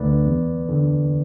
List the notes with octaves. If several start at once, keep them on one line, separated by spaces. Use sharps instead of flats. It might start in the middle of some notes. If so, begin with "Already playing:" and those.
Already playing: D2 D3 A3 B4 D5
E2
D3